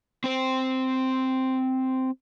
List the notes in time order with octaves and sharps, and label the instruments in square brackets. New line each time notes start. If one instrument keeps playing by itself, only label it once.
[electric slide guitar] C4 C5